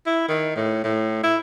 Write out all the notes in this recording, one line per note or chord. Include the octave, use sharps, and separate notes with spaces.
E4
D#3
A2
A2
E4